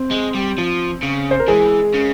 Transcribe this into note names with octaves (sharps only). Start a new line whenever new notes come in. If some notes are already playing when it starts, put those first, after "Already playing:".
Already playing: C4
G#3
G3
F3
C#3
C5
A#4
E3 G#3 G#4
C#3